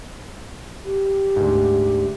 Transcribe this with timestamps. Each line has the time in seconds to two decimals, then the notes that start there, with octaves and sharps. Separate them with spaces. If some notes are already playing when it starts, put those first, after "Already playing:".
0.85 G4
1.36 D2 G#2